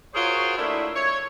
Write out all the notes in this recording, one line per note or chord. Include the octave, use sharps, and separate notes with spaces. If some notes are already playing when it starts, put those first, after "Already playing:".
F4 F#4 G#4 A#4 C5 C#5
A3 A#3 D4 E4
C#5